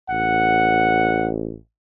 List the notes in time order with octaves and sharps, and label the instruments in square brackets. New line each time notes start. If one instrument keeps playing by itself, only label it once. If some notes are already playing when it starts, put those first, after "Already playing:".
[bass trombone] A1 [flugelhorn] F#5